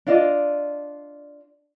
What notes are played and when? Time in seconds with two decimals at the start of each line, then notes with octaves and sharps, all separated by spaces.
0.07 D4 F4 D5 D#5